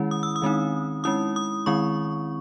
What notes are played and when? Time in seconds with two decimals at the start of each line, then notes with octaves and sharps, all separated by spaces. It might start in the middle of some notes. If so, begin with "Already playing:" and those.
Already playing: D#3 G#3 C#4 E4
0.11 D#6
0.23 E6
0.36 D#6
0.42 D#3 G#3 C4 D#4
1.04 G#3 C#4 E4 D#6
1.36 D#6
1.66 D#3 G#3 C4 E4 C#6